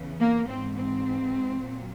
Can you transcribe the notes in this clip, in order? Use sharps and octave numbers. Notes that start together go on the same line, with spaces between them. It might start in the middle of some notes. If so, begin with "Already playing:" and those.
Already playing: E2 C#3 E3
A#3
G#2 E3 C4
C4
A#2 F#3